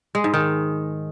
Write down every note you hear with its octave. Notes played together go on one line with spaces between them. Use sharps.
G#3
G#2
D#3